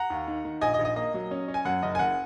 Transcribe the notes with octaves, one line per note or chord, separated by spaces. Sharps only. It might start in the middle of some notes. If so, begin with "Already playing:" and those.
Already playing: F#5 A#5
D#2
D#3
D#3
A#1 D#5 G#5
D#5
A#1
D#5
A#3 D#5
F#3
C#4
C#4
G#5
F#2 F#5
F#1 D#5
G#5
F#1 F#5